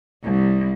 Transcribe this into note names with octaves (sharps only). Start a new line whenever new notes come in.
C2